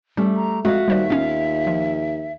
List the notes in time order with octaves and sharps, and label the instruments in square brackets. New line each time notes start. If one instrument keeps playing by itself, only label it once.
[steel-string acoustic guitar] G3 A3 [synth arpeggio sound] C#4
[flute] A#5
[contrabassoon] F2 [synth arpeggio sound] G#3 [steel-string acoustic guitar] F#4 F5 [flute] E5
[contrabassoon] D#2 [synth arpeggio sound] G3 C5 D5
[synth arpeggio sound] B3 C#4 [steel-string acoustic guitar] F4 F5
[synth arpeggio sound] F3